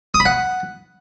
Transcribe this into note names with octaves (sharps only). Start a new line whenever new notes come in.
D#6
B5
F#5